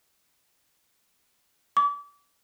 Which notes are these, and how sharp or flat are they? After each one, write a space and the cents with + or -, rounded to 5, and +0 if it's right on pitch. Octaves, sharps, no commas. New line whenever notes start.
D6 -35